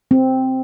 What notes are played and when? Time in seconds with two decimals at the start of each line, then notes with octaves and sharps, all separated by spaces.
0.11 C4